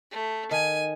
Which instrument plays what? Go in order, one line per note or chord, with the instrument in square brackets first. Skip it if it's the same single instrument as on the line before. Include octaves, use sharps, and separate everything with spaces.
[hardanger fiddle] A3
[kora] D#3 [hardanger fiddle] G#5